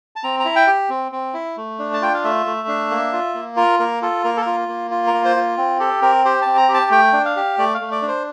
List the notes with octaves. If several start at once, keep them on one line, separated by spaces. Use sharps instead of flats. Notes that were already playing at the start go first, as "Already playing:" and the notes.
A5
C4 A#5
A#5
E4
G5
G4
C4
C4
E4
A3
D4
A5
F4 G5
F5
A3 E5
A3
D4
A#3
F4
A#3
F4 A#4
A#3 A#4
F4 A4
A#3 A#4
A4
A#4
F4
A#3
F4
A#4
A#3
C5
F4
C4
G4 A4
C4 A#4
G4 C5
C4 A5
A#5
G4
A5
A3 G5
D4
F5
G4
A3 D5
F5
A3
D5
D4
C5